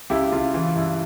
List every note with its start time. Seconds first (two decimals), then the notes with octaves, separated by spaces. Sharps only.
0.10 C#2 E4 G4
0.32 C#2 F4
0.54 E3 F4
0.76 G2 E4